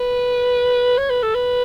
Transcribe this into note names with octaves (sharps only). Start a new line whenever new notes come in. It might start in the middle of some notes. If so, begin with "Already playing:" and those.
Already playing: B4
C#5
B4
A4
B4